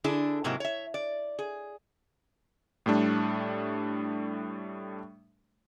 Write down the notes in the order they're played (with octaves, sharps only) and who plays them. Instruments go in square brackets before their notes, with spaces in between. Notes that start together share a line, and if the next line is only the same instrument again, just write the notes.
[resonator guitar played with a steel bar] D3 D4 E4 G#4
G#2 C3 F#3 A#3 E4
C#5 E5
D5
G#4
[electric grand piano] A2 G3 A3 D4